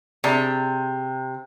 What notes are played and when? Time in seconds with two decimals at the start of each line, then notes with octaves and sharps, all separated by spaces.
0.24 C3 G#4 D5 A5